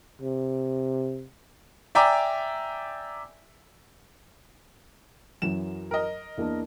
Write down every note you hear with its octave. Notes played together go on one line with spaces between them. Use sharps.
C3
D5 E5 G5 G#5 A#5 D6
F#2 E3 F#3 E7
A#4 D#5
E2 A#3 D4